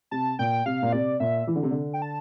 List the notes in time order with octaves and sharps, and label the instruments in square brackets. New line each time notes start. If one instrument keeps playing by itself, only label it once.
[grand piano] C3 [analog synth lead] A5
[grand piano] A#2 [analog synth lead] G5
[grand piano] C3 [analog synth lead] F5
[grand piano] A#2
[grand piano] C3 [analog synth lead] D5
[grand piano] A#2 [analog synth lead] E5
[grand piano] E3
D3
C3
D3
[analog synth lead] G5
A5